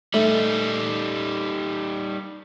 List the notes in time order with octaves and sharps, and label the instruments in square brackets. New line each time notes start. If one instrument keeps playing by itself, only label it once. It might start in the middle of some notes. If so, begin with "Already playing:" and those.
[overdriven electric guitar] G3 D#4 [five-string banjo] A3